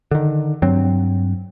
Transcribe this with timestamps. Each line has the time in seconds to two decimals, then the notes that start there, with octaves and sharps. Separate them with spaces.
0.11 D3 D#3
0.62 G2 F#3 C4